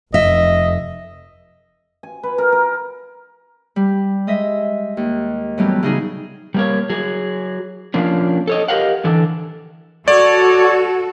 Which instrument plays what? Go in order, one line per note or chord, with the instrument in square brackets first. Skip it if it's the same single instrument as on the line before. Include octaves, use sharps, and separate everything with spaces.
[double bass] F1 [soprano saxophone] D#5 [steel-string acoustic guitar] E5
[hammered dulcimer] G#5
B4
A#4
A#4
[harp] G3
G#3 D#5 E5
D#2
A2 E3 F#3 G3 B3 C#4
C#3 G3 D#4 F#4 G#4
[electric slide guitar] G3 A#3 C#5
F#3 G#4
F3 A#3 C#4 D4
A4 C#5 D#5
G4 A#4 D#5 F5 F#5
D3 E3 A4
[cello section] F#4 A4 [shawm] C#5 [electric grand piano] D5